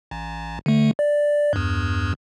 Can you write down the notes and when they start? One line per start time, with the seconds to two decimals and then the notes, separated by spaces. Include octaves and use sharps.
0.11 A1
0.66 D3 A3
0.99 D5
1.53 E2 G2